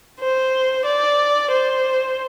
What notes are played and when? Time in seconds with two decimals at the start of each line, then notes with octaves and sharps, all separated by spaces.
0.20 C5
0.85 D5
1.52 C5